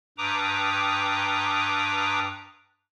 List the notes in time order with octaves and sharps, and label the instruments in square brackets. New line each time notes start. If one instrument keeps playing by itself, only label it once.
[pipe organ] G2 B4 G5 A#5 D6 D#6